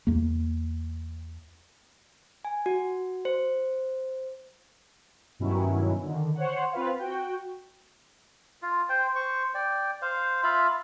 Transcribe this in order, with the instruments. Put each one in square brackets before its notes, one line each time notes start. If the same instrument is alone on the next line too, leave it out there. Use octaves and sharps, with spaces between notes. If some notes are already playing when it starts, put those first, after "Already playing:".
[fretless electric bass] E2 A#3
[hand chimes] G#5
F#4
C5
[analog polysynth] G2 B2 D#3 F#3 C#4 E4
D3 D#3
C5 C#5 F#5
C4 F4 B4 F5
F#4 G5
[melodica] F4
C5 G5
C5 C#6
D5 G5
C5 F5
F4 E5 F5 B5